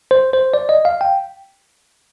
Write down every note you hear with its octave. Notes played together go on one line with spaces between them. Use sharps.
C5
C5
D5
D#5
F5
G5